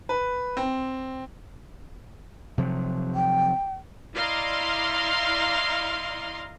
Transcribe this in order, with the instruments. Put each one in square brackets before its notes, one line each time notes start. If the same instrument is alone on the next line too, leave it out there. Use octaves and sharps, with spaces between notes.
[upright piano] B4
C4
[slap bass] C3 F3 F#3
[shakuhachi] G5
[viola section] E4 D5 D#5 F5 A#5 C6